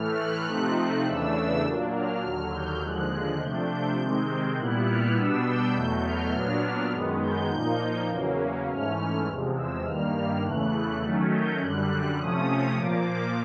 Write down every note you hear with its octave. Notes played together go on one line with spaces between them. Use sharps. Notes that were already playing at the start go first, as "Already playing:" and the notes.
Already playing: A2 E3 A3 F6
F#6
C3 F3 A3 C4 D#4
F#6
E2 C#3 E3 A3 D4 E6
A#2 F#3 A#3 D4
F6
D#2 D3 F#3
G6
D#2 D3 F3 G#3 F#6
F#6
C3 F3 A3 D4 G6
G6
C3 D#3 G#3 C4
A#2 G3 B3 E4 F#6
F6
B2 G3 B3 D4 E6
G6
E2 B2 F#3 A3
F6
A#2 F#3 B3 D4
F#2 D#3 G#3 B3
G6
A#2 F3 A#3 D#4
E2 C#3 F#3 A#3 C#4
G#2 E3 A3 C#4 F6
E2 C3 F3 G#3
E6
G2 D#3 G3 A#3 F6
E2 C#3 E3 A3 F#6
D#3 F#3 A3 C#4
G6
F#2 D3 G3 F#6
C3 F3 A3 C#4 D#6
A#2 F3 A#3 D6